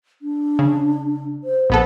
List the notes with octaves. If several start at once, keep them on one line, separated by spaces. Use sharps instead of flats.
D4
C#3
C5
A#1 B3 A4